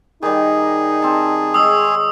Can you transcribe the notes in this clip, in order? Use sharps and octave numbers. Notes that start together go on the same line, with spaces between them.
D#3 G3 D#4 G#4
C4 A5
G#3 C#5 D#6 E6